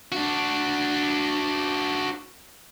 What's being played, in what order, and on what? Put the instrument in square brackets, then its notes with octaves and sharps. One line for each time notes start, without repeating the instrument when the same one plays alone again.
[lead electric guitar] D4 F#4